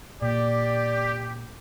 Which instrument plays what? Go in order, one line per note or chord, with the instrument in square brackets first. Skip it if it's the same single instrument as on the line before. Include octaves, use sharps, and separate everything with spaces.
[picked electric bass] A#2 [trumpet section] G4 [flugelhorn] D5